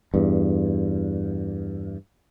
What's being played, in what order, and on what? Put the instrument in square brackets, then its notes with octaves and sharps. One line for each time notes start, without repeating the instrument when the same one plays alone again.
[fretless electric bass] E2 G2